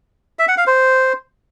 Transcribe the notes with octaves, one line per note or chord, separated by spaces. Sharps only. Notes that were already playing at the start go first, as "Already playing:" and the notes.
E5
F#5
F5
C5